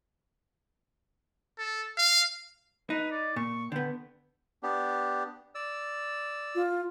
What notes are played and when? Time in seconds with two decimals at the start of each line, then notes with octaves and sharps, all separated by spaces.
1.58 A4
1.98 F5
2.90 D#4 B4
3.12 D5
3.36 A#2 C#6
3.72 D3 B3 G5
4.63 B3 D4 G4
5.55 D5 E6
6.55 F4